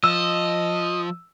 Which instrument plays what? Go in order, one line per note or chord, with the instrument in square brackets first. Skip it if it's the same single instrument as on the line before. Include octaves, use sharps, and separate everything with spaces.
[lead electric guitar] F3 [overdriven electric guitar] D#5 [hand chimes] E6